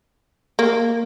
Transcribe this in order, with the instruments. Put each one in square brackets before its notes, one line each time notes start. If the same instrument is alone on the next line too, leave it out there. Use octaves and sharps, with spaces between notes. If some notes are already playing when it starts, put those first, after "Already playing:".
[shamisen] A#3